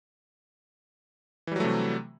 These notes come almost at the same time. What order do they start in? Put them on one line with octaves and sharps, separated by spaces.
E3 G3 F#3 A3 C3